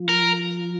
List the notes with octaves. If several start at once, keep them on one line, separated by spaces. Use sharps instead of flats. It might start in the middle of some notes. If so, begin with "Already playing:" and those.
Already playing: F3
A#4